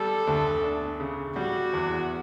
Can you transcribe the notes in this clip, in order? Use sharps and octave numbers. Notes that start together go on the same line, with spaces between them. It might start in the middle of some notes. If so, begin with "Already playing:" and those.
Already playing: G3 A4
D2
D4
C#3
G3 F#4
E2